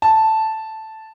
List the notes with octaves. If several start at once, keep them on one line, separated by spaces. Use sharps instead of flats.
A5